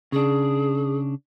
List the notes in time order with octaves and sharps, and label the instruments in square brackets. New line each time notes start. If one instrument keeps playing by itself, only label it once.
[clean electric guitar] C#3 D4 [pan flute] G#4